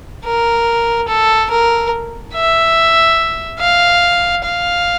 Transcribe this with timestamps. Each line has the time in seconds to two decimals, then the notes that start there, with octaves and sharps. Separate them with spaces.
0.25 A#4
1.08 A4
1.51 A#4
2.34 E5
3.59 F5
4.44 F5